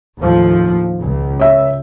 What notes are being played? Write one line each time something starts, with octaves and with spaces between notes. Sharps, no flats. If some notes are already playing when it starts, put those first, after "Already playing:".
D#2 A2 F3
C#2
C#5 E5